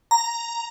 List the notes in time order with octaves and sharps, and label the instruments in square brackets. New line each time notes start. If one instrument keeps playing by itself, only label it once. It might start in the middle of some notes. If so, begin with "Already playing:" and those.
[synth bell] A#5